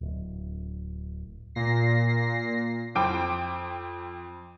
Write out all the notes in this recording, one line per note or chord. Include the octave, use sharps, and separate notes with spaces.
D1
A#2 A#6 C7
F2 C5 G5 D6